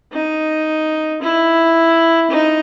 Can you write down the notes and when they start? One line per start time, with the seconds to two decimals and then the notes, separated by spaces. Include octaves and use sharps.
0.13 D#4
1.22 E4
2.31 D#4